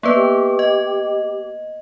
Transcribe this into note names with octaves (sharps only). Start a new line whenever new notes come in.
A#3 B3 B4 D5
G4
D#5